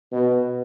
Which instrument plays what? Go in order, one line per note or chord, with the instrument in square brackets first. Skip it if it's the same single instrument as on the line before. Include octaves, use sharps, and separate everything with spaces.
[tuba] B2